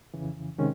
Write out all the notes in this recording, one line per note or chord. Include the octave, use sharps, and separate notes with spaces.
F2 C#3 E3
C3 D#3 G#3 C#4